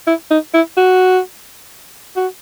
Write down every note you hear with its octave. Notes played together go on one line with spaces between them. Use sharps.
E4
D#4
E4
F#4
F#4